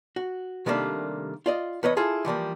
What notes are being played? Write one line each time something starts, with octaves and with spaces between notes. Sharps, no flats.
F#4
C3 D#3 G3 A3 A#3 D4
F4 D5 D#5
E2 B4 C#5 D#5
E4 F4 G#4 A4
E3 F3 G3 A#3